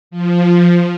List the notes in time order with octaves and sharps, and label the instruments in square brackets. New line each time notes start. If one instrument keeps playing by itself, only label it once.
[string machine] F3